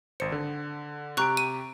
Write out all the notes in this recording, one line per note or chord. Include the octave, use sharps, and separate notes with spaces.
G#1 C5 C#7
D3
C3 G4 A#5 C#6 F#6 D7
D#7